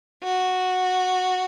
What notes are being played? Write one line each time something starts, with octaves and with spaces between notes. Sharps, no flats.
F#4